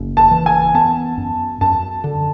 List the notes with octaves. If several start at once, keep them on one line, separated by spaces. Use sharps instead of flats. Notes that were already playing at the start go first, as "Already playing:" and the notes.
Already playing: F#1
A5
E3
G#5
B3 A5
F#2
F#2 A5
D3